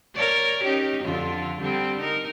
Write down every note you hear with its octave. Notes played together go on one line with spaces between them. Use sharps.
A#4 C#5 D5
C#4 D#4 G4
F2 D3 F4
D3 G3 C4
D#4 A#4